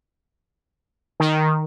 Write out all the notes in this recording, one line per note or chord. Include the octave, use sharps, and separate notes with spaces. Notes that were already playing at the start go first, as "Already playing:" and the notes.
D#3